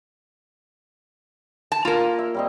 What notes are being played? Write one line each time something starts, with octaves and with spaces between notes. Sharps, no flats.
A5
A#3 F4 A#4
E5
G3 C4 D#5